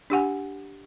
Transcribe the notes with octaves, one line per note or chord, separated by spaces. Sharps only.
D4 G4 F#5 G#5